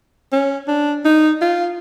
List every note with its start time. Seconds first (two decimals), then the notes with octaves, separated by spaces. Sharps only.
0.32 C#4
0.68 D4
1.05 D#4
1.41 F4